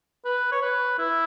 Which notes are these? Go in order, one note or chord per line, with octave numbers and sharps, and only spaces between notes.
B4
C#5
B4
E4